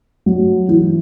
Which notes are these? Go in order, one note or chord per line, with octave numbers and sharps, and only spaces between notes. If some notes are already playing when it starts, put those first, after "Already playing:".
F#3
E3